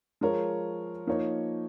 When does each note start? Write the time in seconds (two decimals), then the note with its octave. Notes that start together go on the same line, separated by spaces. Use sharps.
0.21 F3 G#3 F4 A#4 C#5
1.07 F3 A#3 D#4 C#5